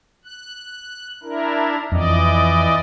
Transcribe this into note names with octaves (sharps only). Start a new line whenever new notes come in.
F#6
D4 E4 A#4
F2 E3 D5 D#5